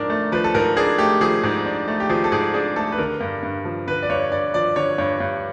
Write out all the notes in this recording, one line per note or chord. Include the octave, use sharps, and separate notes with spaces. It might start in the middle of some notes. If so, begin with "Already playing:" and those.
Already playing: G#2 F3 D4 A#4
A3
F3 B4
A4
G#2 A#4
D4 G#4
A3 G4
F3 G#4
G#2
D4
A3
G4
F3 G#4
A4
G#2 G#4
D4 G#4
A3 A4
B4
D3 A#4
G2
G2
F3
D3 B4
D5
G2 C#5
G2 D5
F3 D5
D3 C#5
G2 C#5
G2